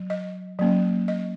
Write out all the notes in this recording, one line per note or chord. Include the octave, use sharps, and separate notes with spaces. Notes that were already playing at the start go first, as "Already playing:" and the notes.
Already playing: F#3
D#5
F#3 A#3 C#4
D#5